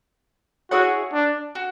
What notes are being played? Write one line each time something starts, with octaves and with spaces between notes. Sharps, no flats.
E4 F#4 G#4 C#5 F#5
D4
F#4